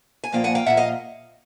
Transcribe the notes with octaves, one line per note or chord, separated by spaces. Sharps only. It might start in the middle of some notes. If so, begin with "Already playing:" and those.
G#5
A#2 F3 A#3 F5 G5
F#5 G#5
F5 G5
A#2 F3 A#3 E5 F#5
D#5 F5